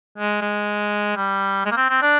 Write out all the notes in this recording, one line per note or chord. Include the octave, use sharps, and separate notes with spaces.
G#3
G#3
G3
G#3
A#3
C4
C4
D4